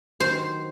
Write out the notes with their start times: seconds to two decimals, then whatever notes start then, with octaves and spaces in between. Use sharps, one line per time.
0.20 D#3 F#3 C5